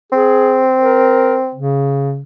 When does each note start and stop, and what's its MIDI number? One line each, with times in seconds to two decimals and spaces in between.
0.12 1.57 60
0.12 0.65 68
0.77 1.38 70
1.55 2.23 49